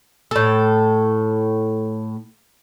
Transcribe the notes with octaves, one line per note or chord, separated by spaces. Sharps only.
A2 A4